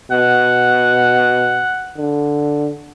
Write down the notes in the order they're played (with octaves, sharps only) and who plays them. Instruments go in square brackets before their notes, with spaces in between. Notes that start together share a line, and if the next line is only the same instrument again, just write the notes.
[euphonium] B2 [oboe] F#5
[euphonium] D3